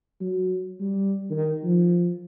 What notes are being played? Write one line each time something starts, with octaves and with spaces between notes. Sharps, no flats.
F#3
G3
D#3
F3